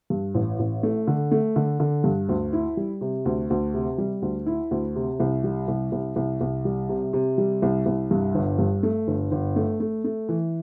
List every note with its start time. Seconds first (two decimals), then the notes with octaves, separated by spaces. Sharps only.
0.10 G2
0.35 A1
0.59 A1
0.83 A3
1.07 D3
1.31 A3
1.56 D3
1.80 D3
2.04 G2
2.29 D2
2.53 E4
2.77 G3
3.01 C3
3.25 D2
3.50 D2
3.74 C3
3.98 G3
4.22 D2
4.46 E4
4.71 D2
4.96 C3
5.20 C2
5.44 G3
5.68 C2
5.92 C2
6.16 C2
6.41 C2
6.65 G3
6.89 C3
7.13 C3
7.38 G3
7.62 C2
7.86 C2
8.11 G2
8.35 G1
8.59 G2
8.83 A3
9.07 G1
9.32 G1
9.56 A3
9.80 A3
10.04 A3
10.29 E3